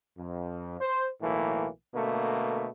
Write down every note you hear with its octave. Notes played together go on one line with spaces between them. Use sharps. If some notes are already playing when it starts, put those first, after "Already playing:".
F2
C5
B1 A2 E3 A#3
B2 D3 A3 A#3